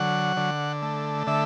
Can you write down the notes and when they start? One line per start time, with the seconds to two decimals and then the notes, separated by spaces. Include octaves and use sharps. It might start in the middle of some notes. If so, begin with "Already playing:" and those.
Already playing: D3 F#3 F#5
0.37 D3
0.82 A3
1.27 D3 E5